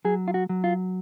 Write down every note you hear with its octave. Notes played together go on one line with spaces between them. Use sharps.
F#3 G#4
F4
F#4
F#3
F4